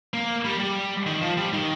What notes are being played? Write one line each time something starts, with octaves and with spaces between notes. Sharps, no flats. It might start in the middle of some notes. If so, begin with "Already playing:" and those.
A#3
G3
G3
D#3
F3
G3
D#3